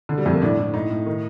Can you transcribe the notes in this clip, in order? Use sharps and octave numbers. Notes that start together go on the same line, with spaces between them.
D3
G3
F2 A3
A#3
A2 D4
A2
A2 D#4
A2
D#3